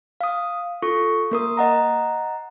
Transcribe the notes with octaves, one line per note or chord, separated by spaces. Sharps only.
F5 D#6
F4 A4 C#6
A#3 A#4 D#6
D#5 F#5 A#5